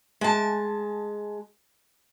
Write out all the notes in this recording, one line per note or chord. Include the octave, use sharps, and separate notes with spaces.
G#3 A5